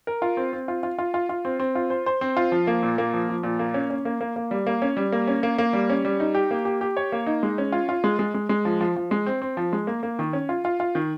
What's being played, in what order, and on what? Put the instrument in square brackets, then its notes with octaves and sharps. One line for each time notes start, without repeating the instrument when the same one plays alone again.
[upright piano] A#4
F4
C4
C4
F4
F4
F4
F4
F4
C4
C4
F4
C5
C5
C4
F4
F3
A#3
A#2
A#3
F3
F3
A#2
A#3
C#4
C#4
A#3
A#3
A#3
G3
A#3
C#4
G3
A#3
C#4
A#3
A#3
G3
C#4
G3
D#4
G4
A#3
G4
G4
C#5
A#3
D#4
G#3
C#4
F4
F4
G#3
G#3
G#3
G#3
F3
F3
F3
G#3
C4
C4
F3
G#3
A#3
A#3
D#3
C#4
F4
F4
F4
D#3